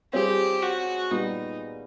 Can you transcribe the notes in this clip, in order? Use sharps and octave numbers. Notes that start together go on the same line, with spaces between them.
G3 C4 F4 G4 G#4 C#5
F#4
A#2 G3 B3 D#4